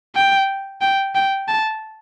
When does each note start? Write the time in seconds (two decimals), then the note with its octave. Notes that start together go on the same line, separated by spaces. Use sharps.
0.16 G5
0.81 G5
1.15 G5
1.48 A5